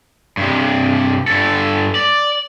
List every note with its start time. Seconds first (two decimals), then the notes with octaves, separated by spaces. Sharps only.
0.37 G2 C3
1.28 G2 A4
1.95 D5